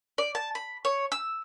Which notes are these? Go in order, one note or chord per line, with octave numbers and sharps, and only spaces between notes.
D5
A5
B5
C#5
E6